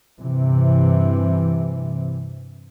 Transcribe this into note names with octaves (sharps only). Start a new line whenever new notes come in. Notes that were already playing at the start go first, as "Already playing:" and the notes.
G2 C3 E3